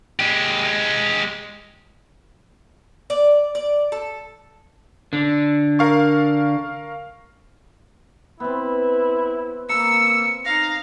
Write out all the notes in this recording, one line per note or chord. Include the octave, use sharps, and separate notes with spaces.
G#3 G4
D5
D5
A4
D3
A#4 F5 C#6
B3 C4 E4
A#3 A#5 E6 C#7
D#4 F5 A#6